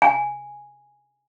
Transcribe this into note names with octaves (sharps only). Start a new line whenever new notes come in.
G#5